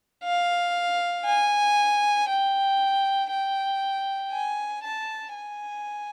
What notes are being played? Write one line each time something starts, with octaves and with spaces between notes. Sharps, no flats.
F5
G#5
G5
G5
G#5
A5
G#5